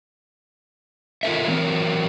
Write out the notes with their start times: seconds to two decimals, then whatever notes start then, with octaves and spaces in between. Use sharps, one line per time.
1.23 F4 A4 A#4 E5
1.48 E3 F#3 C4 A#4